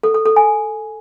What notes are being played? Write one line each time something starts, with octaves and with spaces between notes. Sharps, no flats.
A4
A4
A4
G#5